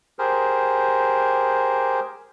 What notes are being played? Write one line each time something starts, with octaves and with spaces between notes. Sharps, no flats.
G4 G#4 A#4 C5